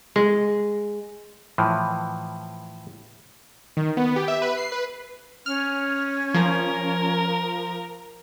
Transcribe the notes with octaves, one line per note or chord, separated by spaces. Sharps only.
G#3
A2 E3 F3
D#3
B3
G4
E5
B4
C7
B4
C#4 F6
F3 A#4